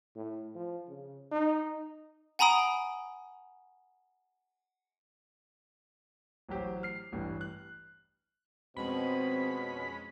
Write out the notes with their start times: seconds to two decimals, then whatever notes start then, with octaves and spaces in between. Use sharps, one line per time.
0.16 A2
0.55 F3
0.88 C#3
1.32 D#4
2.39 F#5 G#5 A#5 B5 D#6 D7
6.48 A1 F#3 G4 C5
6.83 F6 C7
7.12 A1 G2 E3
7.41 F#6
8.76 F2 B2 G#3 C4 C#4 B5